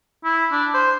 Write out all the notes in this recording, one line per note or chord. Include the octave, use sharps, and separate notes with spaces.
E4
D4
C5